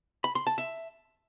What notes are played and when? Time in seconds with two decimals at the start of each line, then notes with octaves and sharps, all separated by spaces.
0.24 B5
0.35 C6
0.47 A5
0.58 E5